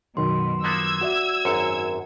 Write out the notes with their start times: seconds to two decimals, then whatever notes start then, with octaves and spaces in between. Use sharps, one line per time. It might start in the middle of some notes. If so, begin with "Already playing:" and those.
0.17 F#2 B2 D#3 F#3 C6
0.64 F3 A#3 B3 E6 G#6
1.01 F#4 D5 E5
1.45 G#1 F#2 A#4 C#7